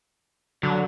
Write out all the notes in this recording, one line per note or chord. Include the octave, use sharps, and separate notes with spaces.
D3 F#3